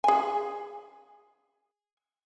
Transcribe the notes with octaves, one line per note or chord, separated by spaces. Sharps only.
G#4 G#5